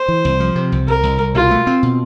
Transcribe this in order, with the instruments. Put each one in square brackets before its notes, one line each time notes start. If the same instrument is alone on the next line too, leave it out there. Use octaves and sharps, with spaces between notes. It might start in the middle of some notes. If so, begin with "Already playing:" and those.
Already playing: [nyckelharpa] C5
[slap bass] E3
C2
F3
C3
C2
[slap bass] C2 [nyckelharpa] A#4
[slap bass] C2
C2
[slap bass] B2 [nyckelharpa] F4
[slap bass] A3
C4
B2